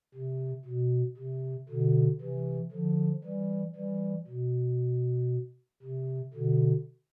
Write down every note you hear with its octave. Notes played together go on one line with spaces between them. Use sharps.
C3
B2
C3
B2 D3
C3 E3
D3 F3
E3 G3
E3 G3
B2
C3
B2 D3